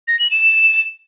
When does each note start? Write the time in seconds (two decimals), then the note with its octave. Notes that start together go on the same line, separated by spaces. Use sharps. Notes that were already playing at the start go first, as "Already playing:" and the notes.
0.07 A#6
0.19 F#7
0.31 E7